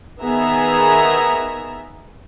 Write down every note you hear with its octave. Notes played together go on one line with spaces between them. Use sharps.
D#3 B3 G#4 E5 A#5